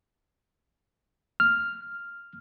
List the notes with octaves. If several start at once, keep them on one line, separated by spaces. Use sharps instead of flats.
F6